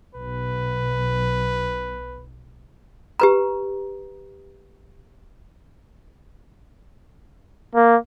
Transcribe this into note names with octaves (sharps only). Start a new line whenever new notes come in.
B1 B4
G4 B4 A#5
A#3